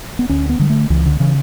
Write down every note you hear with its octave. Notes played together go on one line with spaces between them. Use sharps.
B3
D2 C#4
B3
D3 G3
A3
C#2 E3
D3
C#3 E3